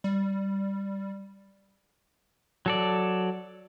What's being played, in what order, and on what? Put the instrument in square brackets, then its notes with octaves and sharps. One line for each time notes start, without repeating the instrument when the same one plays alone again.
[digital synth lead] G3
[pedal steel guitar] F#3 A4 D5